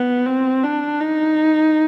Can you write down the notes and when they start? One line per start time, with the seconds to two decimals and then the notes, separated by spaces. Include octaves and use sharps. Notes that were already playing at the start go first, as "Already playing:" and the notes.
Already playing: B3
0.26 C4
0.64 D4
1.01 D#4